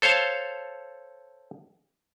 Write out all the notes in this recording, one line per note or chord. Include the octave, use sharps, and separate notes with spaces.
A4 C5 C#5 F5 A5